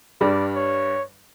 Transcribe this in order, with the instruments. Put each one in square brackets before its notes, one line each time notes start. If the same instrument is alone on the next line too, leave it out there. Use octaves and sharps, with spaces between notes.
[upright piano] G2 G3 [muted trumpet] D5
[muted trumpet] C#5